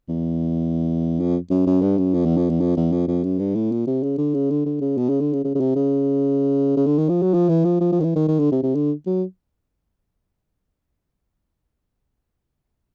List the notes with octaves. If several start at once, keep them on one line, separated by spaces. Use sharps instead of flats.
E2
F2
F#2
F#2
G2
F#2
F2
E2
F2
E2
F2
E2
F2
F2
F#2
G2
A2
A#2
C3
C#3
D3
C#3
D3
D3
C#3
B2
C#3
D3
C#3
C#3
C#3
C3
C#3
C#3
D3
D#3
F3
F#3
F3
E3
F3
F3
F3
D#3
E3
D#3
D#3
D3
C3
C3
D3
F#3